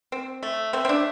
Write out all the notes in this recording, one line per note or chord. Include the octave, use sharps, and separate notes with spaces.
C4
A3
A3 C4
C4
D4